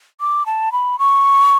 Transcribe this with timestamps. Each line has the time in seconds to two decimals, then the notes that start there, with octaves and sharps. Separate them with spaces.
0.20 D6
0.46 A5
0.72 B5
0.99 C#6